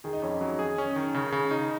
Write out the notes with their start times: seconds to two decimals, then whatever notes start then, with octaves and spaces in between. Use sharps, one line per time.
0.04 D#3 G#4
0.13 D#4
0.22 F2 C#4
0.41 F#3 D#4
0.59 G#4
0.78 C#4
0.96 D#3
1.14 C#3 G#4
1.32 C#3
1.51 D#4